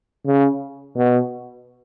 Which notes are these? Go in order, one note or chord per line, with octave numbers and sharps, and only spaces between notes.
C#3
B2